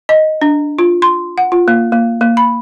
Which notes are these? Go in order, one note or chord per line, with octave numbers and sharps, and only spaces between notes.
D#5
D4
F4
C6
F#5
F4
A#3
A#3
A#3
B5